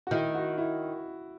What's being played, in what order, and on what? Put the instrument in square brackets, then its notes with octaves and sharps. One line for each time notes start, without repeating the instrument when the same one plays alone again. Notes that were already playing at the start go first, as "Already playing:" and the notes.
[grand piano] F#4
[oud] D#3 [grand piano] E4
[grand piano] F#4
E4